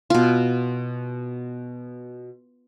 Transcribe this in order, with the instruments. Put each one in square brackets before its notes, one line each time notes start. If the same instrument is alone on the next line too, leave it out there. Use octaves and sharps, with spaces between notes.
[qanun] B2 F4